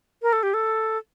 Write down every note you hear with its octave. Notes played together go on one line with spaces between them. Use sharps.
A#4
A4
G4
A4